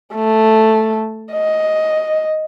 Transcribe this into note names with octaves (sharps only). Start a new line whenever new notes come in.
A3
D#5